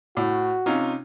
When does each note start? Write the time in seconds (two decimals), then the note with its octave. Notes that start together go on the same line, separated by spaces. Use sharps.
0.17 A2 F#4
0.66 C3 C#4 D#4 F4